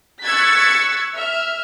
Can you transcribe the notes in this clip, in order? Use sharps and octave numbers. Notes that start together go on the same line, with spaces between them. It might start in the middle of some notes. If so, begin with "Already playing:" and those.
C#6 E6 F#6 G#6 A6 B6
E5 F6